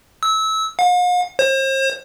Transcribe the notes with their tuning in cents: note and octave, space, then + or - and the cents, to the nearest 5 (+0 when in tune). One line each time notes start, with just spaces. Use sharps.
E6 -25
F5 +45
C5 +40